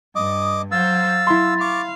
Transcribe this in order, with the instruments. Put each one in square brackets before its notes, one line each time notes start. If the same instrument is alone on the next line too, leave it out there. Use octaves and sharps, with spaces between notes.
[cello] G2 [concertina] D#5 D6 [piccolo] D#6
[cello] F#3 C5 [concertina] F5 E6 [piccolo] A6
[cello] F#3 [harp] E4 C6
[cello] F5 [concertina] C#6 D6